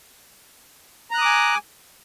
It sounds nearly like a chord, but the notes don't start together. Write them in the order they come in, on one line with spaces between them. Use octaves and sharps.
A#5 F#6 D#6 D6 G#5